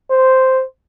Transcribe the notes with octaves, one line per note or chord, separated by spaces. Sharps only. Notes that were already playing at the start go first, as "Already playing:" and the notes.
C5